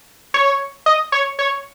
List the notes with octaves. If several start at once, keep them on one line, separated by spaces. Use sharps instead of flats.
C#5
D#5
C#5
C#5